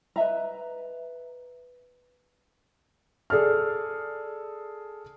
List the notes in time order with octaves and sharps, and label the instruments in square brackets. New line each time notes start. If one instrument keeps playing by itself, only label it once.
[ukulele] B4 D#5 E5 A#5
[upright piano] G#4 A4 D5 F6